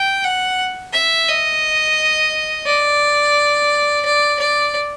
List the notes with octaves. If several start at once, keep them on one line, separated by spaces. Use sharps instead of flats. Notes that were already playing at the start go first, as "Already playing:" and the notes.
Already playing: G5
F#5
E5
D#5
D5
D5
D5